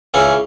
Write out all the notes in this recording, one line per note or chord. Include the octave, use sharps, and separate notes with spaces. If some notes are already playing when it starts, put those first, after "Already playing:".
C#2 C#3 E3 C#4